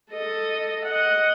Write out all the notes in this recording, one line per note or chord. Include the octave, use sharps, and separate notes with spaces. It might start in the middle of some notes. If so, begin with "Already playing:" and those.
A4 D#5
D#5 F#5